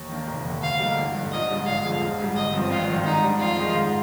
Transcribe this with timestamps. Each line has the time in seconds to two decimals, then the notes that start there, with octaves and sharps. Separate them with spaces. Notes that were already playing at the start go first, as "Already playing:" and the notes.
Already playing: D#2
0.09 D#3 A#3 D4
0.28 F1
0.44 D#2 D3
0.62 D2 F5
0.79 D3 G3 A#3 D#4
0.97 G1
1.14 G2 D3
1.31 A#1 D#5
1.50 G#2 G3 D4
1.66 G1 F5
1.84 F2 D3 G#3
2.01 A#1
2.19 G#2 G3
2.36 G1 D#5
2.53 G2 F3 C4
2.70 G#1 F4
2.88 G2 D#3
3.05 G#2 D#4
3.24 G3 D4
3.40 F2 F4
3.58 D#3 G#3 D#4
3.75 G#2